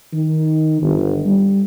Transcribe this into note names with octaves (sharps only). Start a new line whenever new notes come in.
D#3
G1
G3